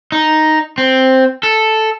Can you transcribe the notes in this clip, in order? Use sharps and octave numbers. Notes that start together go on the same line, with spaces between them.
D#4
C4
A4